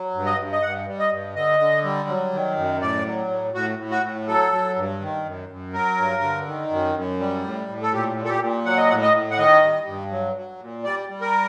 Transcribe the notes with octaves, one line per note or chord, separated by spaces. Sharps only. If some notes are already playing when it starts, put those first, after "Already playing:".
Already playing: F#3
G2
D#5
G2
D#5
G2 F#5
G3
D#5
G2
D3 D#5
D3
G3
F#3
D#3
F#2
A2 D5
F#3
A2
A2 F#4
A2
F#4
A2
F#3 A4
F#3
G2
D#3
F#2
F#2
F#3 A#4
G2
D3
D#3
F#2
F#2
G3
A2
A2
A4
A#2 G4
A#2
A4
G4
A#2
F#3 F#5
D#5
A2 F#5
D#5
A2
F#5
D#3 D#5
G3
G2
F#3
F#3
A#2
G3 D5
G3
A#4